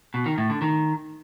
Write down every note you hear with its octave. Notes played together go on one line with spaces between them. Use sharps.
B2
D#3
A2
D3
D#3